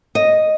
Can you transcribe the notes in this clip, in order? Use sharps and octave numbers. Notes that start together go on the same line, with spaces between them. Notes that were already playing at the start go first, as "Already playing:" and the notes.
D#5